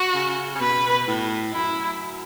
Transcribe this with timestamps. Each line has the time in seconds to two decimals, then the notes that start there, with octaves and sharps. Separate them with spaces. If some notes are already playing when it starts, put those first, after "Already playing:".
Already playing: F#4
0.14 C#3
0.55 C#3
0.60 B2 B4
1.07 A2
1.53 F#2 E4